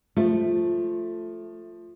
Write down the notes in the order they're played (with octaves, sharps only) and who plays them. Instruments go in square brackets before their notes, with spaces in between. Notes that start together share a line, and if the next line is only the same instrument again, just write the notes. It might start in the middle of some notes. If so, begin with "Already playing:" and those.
[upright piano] F3 [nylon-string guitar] A3